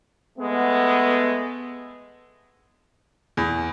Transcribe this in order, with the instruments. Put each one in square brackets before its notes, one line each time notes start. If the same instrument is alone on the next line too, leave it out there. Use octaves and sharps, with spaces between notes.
[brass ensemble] G#3 A3 B3
[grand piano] E2